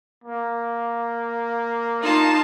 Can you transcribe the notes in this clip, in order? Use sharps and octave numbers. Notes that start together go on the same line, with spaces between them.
A#3
D#4 F4 A5